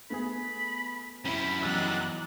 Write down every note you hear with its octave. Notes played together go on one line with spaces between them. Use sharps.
A3 B3 G#4 B5
F#2 G3 C4 E4 B5
E2 F#3 D4 D#4 E6 F#6